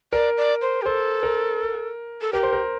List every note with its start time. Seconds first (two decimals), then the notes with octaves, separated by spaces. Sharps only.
0.13 A#4 D5
0.37 D5
0.62 C5
0.82 G4
0.86 A4 C5
1.23 A#4
2.21 A4
2.33 G4 A#4
2.43 C5
2.53 A#4